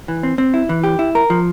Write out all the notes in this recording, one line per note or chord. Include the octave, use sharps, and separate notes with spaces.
E3
C4
C4
E4
E3
G4
E4
A#4
F3